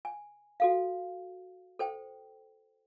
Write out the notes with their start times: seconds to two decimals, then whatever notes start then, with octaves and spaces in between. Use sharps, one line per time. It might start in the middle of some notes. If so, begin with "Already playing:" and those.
0.05 G#5
0.60 F#4 A4 F5
1.79 A4 C5 G5